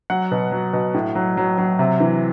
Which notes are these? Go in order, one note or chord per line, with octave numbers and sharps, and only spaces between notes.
F#3 F#5
B2
F#3
B2
A2
F#3
F#3
F#3
C3
E3